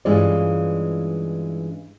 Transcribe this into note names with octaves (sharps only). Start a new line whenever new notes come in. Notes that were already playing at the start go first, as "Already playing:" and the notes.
G2 E3 G#3 C#4 F4 D5